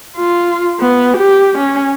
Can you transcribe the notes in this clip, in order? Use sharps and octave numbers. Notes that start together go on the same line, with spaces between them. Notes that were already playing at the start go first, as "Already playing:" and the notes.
F4
B3
G4
C#4